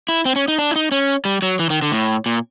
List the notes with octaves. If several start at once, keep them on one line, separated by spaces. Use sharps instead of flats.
E4
C4
C#4
D#4
D4
E4
D#4
C#4
G3
F#3
E3
D#3
D3
A2
A#2